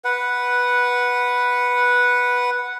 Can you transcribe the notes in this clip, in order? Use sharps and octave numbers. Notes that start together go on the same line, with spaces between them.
B4 F#5